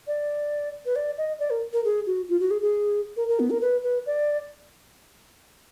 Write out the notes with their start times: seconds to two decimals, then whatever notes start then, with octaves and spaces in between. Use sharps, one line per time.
0.07 D5
0.86 B4
0.96 D5
1.18 D#5
1.39 D5
1.50 A#4
1.73 A#4
1.85 G#4
2.07 F#4
2.29 F4
2.40 F#4
2.51 G#4
2.62 G#4
3.17 A#4
3.28 A#4
3.40 B3
3.50 A#4
3.62 B4
3.83 B4
4.06 D5